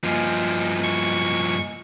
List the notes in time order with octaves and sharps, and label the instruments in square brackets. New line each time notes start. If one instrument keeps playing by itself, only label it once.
[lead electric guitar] G2 F3 [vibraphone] A#3 D#5 G#5
[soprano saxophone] C#6